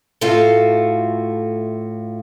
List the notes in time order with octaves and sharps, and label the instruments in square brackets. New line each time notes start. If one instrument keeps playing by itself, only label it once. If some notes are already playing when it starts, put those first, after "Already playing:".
[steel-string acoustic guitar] A2 A3 F4 F#4 A4 F5